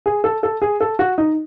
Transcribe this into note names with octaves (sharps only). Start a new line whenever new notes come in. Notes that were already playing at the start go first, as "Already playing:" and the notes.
G#4
A4
A4
G#4
A4
F#4
D#4